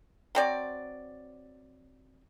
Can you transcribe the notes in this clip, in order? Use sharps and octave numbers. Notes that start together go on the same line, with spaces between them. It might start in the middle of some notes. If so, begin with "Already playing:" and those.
F#3 C4 D5